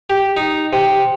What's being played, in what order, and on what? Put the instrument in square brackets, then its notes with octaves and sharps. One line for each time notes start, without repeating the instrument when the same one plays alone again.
[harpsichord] G4
D#4
C3